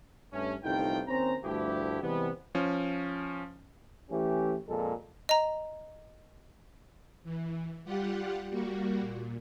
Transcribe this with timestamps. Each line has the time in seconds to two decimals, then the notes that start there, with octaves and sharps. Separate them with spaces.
0.33 G2 A3 C#4
0.64 G1 C2 A3 D#4 F4 G5
1.07 D#2 C4 C#4 C5 A#5
1.44 D2 G2 F3 A3 E4 G4
2.02 C3 E3 G3 G#3 B3
2.55 F3 C#4
4.11 E3 A3 C#4 G4
4.69 F2 A#2 G#3 A4
5.29 D#5 A#5
7.24 E3
7.85 G3 F4 G4 F#5
8.50 G3 A#3 F#4
9.00 A#2